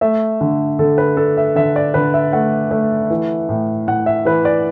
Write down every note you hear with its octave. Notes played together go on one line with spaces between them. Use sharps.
A3 E5
D3
D3 A4
B4
D4 A4
E5
D3 E5
D5
D3 B4
E5
A3 F#5
A3
E3
A2
A2 F#5
E5
E3 B4
D5